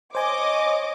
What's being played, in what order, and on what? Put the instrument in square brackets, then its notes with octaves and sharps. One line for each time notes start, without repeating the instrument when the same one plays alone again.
[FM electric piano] C5 G#5 [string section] C#5 D#5 D6